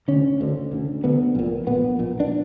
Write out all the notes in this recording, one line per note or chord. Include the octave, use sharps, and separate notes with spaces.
D2 D3 C#4
D2 D3
D2 D3
D2 D3 B3
A#1 A#2
A#1 A#2 B3
A#1 A#2
D4